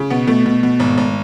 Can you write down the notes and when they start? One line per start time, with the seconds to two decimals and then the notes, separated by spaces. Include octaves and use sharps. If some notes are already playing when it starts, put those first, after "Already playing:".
Already playing: C#3
0.10 B2 B3
0.27 B2 A3
0.46 B2
0.63 B2
0.80 G#1
0.97 G#1